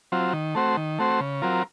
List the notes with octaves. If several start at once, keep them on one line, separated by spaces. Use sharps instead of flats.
F#3 C4 F4
D#3
A3 C4 F#4 C5
D#3
A3 C4 F#4 C5
C#3
F#3 C4 F4 A#4